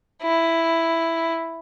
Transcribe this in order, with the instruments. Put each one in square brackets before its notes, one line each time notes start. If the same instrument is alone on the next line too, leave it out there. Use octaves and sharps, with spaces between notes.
[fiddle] E4